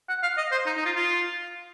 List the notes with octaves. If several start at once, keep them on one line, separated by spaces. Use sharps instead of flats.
F#5
F5
D#5
C5
D#4
D#4
F4
F4